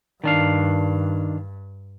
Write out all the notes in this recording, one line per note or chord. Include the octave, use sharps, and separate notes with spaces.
G2 D#3 D4 F5